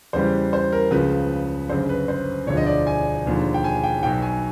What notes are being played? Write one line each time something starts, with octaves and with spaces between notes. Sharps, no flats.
E2 C#3 E3 G3 C5
C5
A#4
C#2 C#3 F3 B4
G1 F#2 C#3 C5
B4
C5
E1 D2 D3 F3 C#5
D#5
D5
G#5
E1 D#2 D3 F3
G5
G#5
G5
B1 B2 F#3 G5
G#5